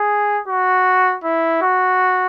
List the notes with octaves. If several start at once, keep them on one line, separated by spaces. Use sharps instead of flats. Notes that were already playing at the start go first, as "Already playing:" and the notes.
Already playing: G#4
F#4
E4
F#4